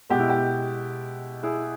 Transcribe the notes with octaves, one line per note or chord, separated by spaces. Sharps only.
B2 G#3 B3 G4
E4
G4
E4 G#4